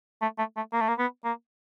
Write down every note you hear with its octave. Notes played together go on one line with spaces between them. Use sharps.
A3
A3
A3
A#3
A3
A#3
B3
A#3